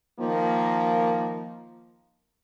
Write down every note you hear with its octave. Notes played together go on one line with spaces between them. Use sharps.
D#3 F3 A#3